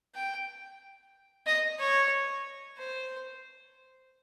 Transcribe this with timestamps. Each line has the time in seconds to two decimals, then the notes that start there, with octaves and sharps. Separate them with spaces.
0.15 G5
1.46 D#5
1.79 C#5
2.78 C5